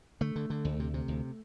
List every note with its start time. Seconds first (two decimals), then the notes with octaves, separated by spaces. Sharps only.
0.21 D3 A3
0.36 D3
0.50 D3
0.65 D2
0.80 C3
0.94 C3
1.08 D2